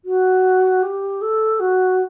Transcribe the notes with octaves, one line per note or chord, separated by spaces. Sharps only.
F#4
G4
A4
F#4